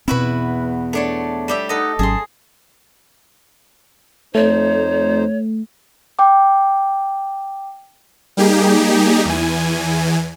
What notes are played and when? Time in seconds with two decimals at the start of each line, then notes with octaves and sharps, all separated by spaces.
0.08 E2 B2 C4 E4 F#4 B4
0.93 A3 D4 C#5
1.48 G3 G4 E5
1.69 D#4 A4 D#5 F#5
1.99 G#1 F#3 C#4 G#4 A5 C6
4.35 F2 A3 D#4 C5 C#5
6.19 G5 D6
8.37 G3 A#3 D#4 G4 G#4
9.25 E2 E3 G#5